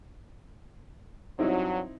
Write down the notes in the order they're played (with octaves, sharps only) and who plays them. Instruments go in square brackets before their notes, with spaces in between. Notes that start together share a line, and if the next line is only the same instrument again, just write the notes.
[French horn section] G2 F#3 [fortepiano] C4 D#4 E4